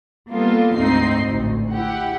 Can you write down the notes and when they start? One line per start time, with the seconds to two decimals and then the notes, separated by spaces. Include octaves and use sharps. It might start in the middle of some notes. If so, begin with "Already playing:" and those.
0.31 G3 A#3 B3 F4 A4
0.75 D2 G#2 C4 D#4 C7
1.24 A1 D2
1.73 E4 G4 F#5